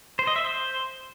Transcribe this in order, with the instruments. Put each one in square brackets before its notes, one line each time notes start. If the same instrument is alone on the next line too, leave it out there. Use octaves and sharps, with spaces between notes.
[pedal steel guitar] C5
D#5
E5
C5